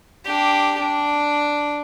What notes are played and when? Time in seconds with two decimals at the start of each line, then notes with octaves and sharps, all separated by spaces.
0.25 D4 G4
0.79 D4